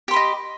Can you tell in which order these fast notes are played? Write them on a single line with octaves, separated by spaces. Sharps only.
G4 C6 B5 D#5